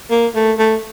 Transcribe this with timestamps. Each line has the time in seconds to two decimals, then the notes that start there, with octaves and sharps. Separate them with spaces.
0.10 A#3
0.35 A3
0.58 A3